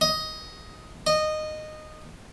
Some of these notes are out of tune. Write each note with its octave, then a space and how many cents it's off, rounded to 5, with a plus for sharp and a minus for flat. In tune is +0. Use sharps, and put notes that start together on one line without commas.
D#5 +10
D#5 -15